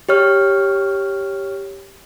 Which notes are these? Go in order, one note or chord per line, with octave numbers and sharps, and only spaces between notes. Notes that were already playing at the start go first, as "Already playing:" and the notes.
G4 C#5 F6